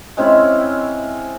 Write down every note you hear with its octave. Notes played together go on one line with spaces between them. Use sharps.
G#3 C4 C#4 E4